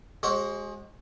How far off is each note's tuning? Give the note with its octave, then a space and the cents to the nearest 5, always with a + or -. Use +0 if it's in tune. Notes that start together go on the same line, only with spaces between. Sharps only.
G#3 -5 F#4 +35 C5 +40